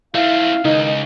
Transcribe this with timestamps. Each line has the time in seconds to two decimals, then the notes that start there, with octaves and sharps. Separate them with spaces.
0.15 A3 C4 E4 E5 F5
0.65 C#2 D#3 D#4